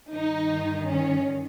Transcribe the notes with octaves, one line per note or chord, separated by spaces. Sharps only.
G2 D#3 D#4
C#4